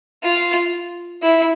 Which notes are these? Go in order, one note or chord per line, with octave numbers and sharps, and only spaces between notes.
F4
E4